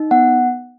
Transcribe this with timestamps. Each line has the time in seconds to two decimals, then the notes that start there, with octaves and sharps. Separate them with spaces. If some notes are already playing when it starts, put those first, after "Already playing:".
Already playing: D#4
0.11 B3 F#5